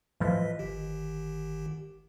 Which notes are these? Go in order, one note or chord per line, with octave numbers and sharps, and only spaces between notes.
A2 E3 F3 B4 D#5 B6
G1 D#3 G4